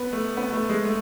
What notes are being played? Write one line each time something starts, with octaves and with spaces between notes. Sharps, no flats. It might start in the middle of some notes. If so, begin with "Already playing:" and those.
Already playing: B3
A3
B3
A3
G#3
A3